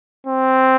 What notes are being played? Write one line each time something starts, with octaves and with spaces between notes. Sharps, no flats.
C4